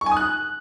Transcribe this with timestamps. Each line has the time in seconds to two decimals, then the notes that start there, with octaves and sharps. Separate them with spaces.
0.01 C#6
0.06 G#5
0.11 D#6
0.17 F#6